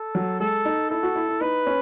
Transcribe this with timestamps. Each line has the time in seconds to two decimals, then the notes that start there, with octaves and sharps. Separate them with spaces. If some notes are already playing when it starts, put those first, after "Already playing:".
Already playing: A4
0.15 F#3
0.40 G#3 A4
0.65 D#4
0.90 E4 A4
1.03 F#4
1.15 E4
1.28 E4
1.41 D#4 B4
1.66 C#4